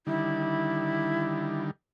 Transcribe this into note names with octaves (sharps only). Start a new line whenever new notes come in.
D3 D#3 G3 E4